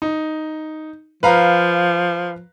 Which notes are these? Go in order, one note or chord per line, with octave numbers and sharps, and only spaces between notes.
D#4
F3 B4 F5 A#5